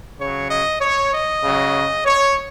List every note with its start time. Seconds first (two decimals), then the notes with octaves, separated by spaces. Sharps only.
0.19 C#3 F#3 C#5
0.50 D#5
0.81 C#5
1.13 D#5
1.43 C#3 F#3
2.05 C#5